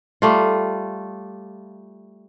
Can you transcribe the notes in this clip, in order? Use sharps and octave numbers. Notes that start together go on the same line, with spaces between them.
G3 A3 F4